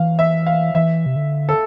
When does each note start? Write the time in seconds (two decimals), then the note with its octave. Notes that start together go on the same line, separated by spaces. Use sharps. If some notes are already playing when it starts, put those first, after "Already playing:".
Already playing: E3 F5
0.19 E5
0.47 F5
0.75 E3 E5
1.06 C3
1.16 D3
1.49 A4